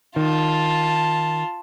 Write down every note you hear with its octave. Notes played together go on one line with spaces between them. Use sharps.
D#3 F4 A5